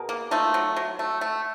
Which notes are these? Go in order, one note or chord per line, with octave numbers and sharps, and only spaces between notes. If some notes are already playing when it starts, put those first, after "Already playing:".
Already playing: B2 G#4 A#4
A#3
A3 D#4 F4
F#3
F#3
A3
A3